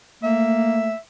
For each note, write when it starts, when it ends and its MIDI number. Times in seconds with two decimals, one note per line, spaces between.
0.23 0.91 57
0.23 0.94 58
0.23 0.97 76